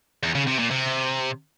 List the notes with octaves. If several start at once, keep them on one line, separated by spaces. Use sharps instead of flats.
E2
C#3
C3
A#2
C3